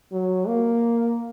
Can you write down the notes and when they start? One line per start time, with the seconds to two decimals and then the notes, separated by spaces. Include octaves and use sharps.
0.12 F#3
0.47 A#3